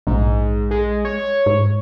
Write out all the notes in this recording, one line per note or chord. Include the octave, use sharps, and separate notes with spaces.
A#1 G#2
G#3
C#5
G#2